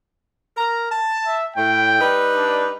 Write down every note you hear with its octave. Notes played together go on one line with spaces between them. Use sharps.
A#4 A#5
A5
E5
A2 G5
G3 D#4 B4
D4